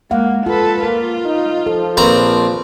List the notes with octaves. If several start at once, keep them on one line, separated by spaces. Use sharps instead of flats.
G#3 A#3 F5 F#5
F4 A4 B4
A#3 F4 A#4
D#4
F3 A4
A#1 C4 B4 C5 A#5